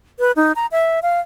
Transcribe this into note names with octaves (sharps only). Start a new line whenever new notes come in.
B4
D#4
A#5
E5
F5